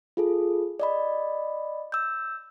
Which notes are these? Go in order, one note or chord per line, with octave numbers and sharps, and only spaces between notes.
F4 G#4 A4
D5 D#5 B5
E6 G6